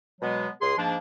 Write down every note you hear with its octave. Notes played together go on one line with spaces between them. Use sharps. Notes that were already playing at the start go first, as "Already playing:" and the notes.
B2 F#3 G#3 B3
C#2 G#4 C6
G#2 F3 A#3 D4